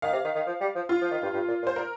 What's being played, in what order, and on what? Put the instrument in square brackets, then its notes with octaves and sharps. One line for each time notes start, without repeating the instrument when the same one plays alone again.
[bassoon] D#3 [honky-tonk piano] F5
[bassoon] C3
D#3
D#3
F3
G3
F3
[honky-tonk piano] F4
[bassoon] F3
D#3
G2
G2
A#2
A#2
[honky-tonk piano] C5
[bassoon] A#2 [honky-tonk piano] A#4